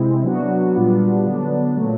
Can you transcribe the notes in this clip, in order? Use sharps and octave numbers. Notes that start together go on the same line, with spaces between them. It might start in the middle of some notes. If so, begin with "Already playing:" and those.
Already playing: C3 G#3 C4 E4
F#3 B3 D4 F#4
A#2 G3 B3 D4 F4
D3 F#3 B3 D4
A#2 F#3 A3